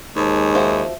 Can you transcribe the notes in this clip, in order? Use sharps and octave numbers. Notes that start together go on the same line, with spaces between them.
D#2 G#3 D#4 C5 A5
F3 F#4 C5 E5